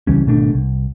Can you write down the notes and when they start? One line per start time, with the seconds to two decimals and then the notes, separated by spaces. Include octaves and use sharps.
0.07 C#2 E3 G3 C#4
0.27 G#1 B2 A3 D4
0.52 C2